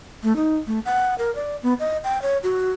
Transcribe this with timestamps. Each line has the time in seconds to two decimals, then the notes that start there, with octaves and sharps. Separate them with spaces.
0.23 A3
0.36 D#4
0.67 A3
0.85 F#5
1.19 A#4
1.35 D5
1.63 B3
1.79 D#5
2.04 G5
2.22 C#5
2.43 F#4